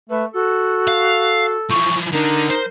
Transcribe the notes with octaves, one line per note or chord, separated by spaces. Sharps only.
A3 B4
F#4 A4
F5
E3 F3 C#6
D3 D4 D#4 A#4
C5